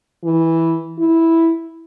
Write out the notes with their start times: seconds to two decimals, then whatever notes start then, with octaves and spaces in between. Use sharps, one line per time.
0.24 E3
0.99 E4